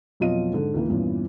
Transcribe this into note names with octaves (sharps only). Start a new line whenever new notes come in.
F2 B2 F#3 F4 D#5 D#7
G#2 D3
C#2 D#3 E3 A#3
E2 G2 A#2 E3 B3 C#4